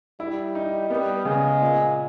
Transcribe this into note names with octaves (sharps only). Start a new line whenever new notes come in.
G3 E4
D#4
G3 B3
C#3 G#3
A#2